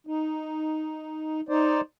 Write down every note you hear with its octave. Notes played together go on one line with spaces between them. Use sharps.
D#4
D#4 C5 D5